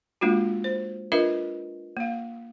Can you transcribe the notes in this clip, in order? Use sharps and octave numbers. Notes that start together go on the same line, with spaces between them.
G#3 A#3 D4 F4 F#4
C5
D4 F4 A#4 B4 D#5 E5
A#3 F5